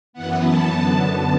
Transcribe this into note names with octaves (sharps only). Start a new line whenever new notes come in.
F#2 E3 B3 F#5
A5
F#2 D3 B3